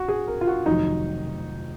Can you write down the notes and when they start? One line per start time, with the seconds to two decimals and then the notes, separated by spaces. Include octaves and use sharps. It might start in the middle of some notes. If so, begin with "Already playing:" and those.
Already playing: F#4
0.08 G#4
0.27 A#4
0.41 F4
0.47 F#4
0.66 F1 F2 D#3 F#3 D#4